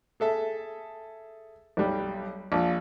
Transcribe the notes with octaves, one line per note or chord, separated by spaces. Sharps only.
G#4 A4 E5
B1 G3
A#1